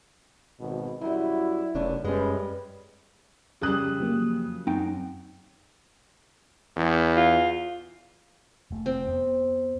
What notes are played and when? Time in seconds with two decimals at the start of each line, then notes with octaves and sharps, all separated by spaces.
0.60 G#1 B2
1.01 F#2 G3 E4 F#4
1.75 F1 F#2 C#4 D4
2.04 F#2 G3 G#3 C#4 B4
3.61 F2 C#3 G3 D#6 F#6
4.00 F3 F#3 A#3
4.67 F#2 C4 D#4 G5
6.76 E2
7.17 F4
8.71 F1 A3
8.86 C4
9.07 F2 B3